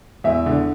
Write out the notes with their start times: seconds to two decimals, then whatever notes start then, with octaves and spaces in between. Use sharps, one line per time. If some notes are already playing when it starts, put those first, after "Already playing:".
0.24 E2 E5
0.46 D3